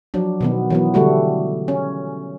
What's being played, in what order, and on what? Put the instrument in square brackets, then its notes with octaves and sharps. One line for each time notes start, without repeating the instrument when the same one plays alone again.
[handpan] F3 F#3 D4
B2 D#3 B3
E3 F#3 B3
D3 G3 A3 F#4
C#4